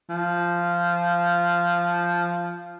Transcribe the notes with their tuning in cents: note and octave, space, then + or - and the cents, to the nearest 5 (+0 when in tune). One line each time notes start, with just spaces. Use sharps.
F3 -10